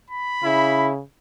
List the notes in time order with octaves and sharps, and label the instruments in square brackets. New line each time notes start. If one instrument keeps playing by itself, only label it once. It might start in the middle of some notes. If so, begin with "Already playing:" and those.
[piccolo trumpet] B5
[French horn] C#3 [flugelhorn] E4